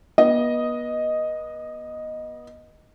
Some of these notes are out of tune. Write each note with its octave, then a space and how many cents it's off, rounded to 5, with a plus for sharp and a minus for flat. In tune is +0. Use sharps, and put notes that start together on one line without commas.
B3 -35 D#5 +0